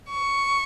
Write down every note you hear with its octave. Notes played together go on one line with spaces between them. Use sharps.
C#6